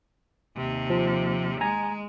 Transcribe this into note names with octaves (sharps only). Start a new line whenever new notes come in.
D#2 C3
F3
G#3 G#5 A#5